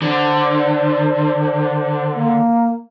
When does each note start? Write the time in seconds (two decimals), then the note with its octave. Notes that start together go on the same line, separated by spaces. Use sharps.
0.02 D3 C5
2.15 A#3